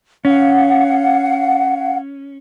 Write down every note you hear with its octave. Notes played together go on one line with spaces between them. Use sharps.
C#4 F5 F#5